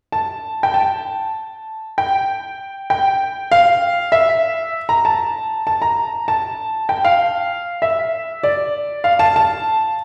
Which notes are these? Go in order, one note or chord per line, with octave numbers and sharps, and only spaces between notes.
A5
G5
A5
G5
G5
F5
E5
A#5
A5
A5
A#5
A5
G5
F5
E5
D5
F5
A5
A5